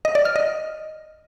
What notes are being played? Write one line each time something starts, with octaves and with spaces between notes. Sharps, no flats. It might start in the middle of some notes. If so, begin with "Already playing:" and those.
D#5
D5
F6
D#5